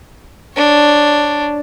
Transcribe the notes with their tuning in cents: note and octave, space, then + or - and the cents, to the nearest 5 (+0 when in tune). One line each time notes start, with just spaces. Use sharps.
D4 +0 C#5 -5